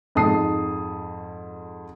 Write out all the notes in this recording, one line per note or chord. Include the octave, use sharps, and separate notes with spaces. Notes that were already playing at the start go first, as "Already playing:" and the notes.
F2 G#2 A5 D#6 C7